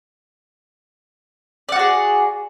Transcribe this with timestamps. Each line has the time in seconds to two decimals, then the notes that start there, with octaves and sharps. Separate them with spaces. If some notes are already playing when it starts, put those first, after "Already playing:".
1.69 D5
1.72 F#5
1.76 F#4
1.79 G#4